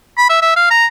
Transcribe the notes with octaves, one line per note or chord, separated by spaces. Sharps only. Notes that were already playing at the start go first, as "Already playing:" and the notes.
B5
E5
E5
F5
A#5